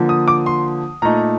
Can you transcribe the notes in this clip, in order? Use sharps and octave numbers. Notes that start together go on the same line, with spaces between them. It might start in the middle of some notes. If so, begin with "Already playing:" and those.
Already playing: D3 F3 A#3
D#6
D6
C6
A#2 A3 D#4 A#5